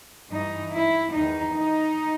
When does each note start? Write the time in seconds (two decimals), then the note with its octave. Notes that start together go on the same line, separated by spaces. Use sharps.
0.31 G2 E3 D#4
0.74 E4
1.15 E2 D#3 D#4
1.57 D#4